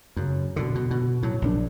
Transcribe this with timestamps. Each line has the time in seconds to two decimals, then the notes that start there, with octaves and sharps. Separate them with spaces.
0.16 F#2 C#3
0.56 B2 D3
0.75 B2
0.91 B2
1.23 A2 F#3
1.42 A#1 D#3 D4